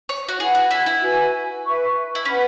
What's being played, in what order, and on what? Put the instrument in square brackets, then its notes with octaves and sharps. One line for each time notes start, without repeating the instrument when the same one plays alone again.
[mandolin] C#5
F#4
[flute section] E4 B4 F#5 [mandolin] G#4
[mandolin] F#4
E4
E4
[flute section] F#4 B4 G#5
B4 E5 C#6
[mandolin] E4
[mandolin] C#4 [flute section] B4 F#5 B5